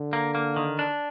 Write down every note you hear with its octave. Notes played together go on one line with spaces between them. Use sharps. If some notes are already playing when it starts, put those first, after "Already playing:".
Already playing: D3
A#3
A#3
D#3
D4